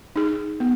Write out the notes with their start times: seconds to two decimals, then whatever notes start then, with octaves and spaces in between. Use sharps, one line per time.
0.16 D#4 G#4
0.60 B3